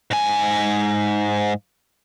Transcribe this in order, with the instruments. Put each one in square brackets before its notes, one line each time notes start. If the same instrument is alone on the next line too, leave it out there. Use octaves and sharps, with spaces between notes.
[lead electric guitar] G#2 G#5